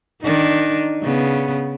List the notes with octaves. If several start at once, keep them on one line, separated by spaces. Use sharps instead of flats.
D#3 D4 D#4
C#3 B3